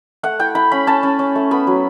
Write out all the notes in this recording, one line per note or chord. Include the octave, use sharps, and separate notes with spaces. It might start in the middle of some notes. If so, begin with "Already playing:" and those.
A3 F#5
E4 G5
E4 B5
C#4 B5
C#4 A5
C#4
C#4
A3
B3 B5
F#3